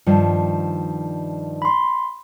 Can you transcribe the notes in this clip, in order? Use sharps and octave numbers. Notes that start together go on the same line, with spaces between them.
G2 D#3 F3
B5 C6